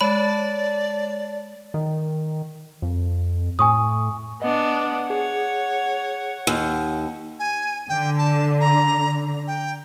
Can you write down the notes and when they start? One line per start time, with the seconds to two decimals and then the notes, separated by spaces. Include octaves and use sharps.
0.01 G#3 C#5 D5 A5 B5
1.74 D#3
2.82 F2
3.59 A2 G#5 C#6 D#6
4.42 B3 D4 D#5 F#5
5.10 G#4 C#5
6.47 D#2
7.39 G#5
7.89 D3 G5
8.18 A5
8.61 A#5
9.47 G5